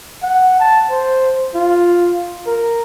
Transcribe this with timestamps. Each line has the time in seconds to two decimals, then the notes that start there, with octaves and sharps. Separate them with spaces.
0.23 F#5
0.60 A5
0.90 C5
1.55 F4
2.46 A#4